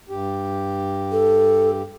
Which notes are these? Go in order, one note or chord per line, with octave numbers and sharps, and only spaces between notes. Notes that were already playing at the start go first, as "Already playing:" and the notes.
G2 G4
A4